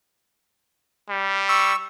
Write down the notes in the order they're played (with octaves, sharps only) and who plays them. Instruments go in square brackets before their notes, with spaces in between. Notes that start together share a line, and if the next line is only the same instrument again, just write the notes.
[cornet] G3
[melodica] C#6 E6